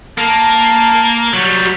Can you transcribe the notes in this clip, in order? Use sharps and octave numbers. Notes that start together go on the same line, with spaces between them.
A#3 A5
F#3 G3 F#4